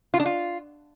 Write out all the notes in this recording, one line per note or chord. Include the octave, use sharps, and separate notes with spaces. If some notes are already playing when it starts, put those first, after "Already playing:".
F4
D4
F4